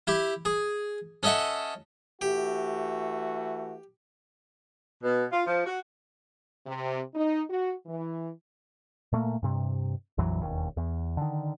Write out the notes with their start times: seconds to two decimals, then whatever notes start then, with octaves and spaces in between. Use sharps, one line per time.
0.07 E4 G4
0.45 G#4
1.23 C#4 A4 D#5 E5 F#5
2.21 E3 A3 F#4 G4
5.04 B2
5.32 F4
5.47 F3
5.66 F#4
6.66 C3
7.14 D#4
7.49 F#4
7.86 E3
9.12 A#2 A3 A#3
9.43 G2 C3
10.18 A#1 F2 E3 F#3
10.42 E1 D#2
10.77 E2
11.17 D3 D#3